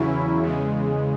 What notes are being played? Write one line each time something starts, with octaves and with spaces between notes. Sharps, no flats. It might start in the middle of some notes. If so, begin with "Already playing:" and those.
Already playing: E2 C#3 F#3 C#4 E4
E2 C#3 G#3